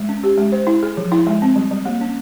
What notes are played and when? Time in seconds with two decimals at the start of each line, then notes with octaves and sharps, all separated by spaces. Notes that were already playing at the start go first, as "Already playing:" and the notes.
Already playing: G#3
0.09 C#4
0.23 G4
0.38 G#3
0.52 C5
0.67 E4
0.83 G#4
0.97 F3
1.12 E4
1.27 G#3
1.42 C4
1.56 G3
1.71 G3
1.85 A#3
2.01 C#4